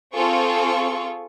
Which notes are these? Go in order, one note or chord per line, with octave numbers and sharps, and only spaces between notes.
C4 F4 G#4 A4 C#6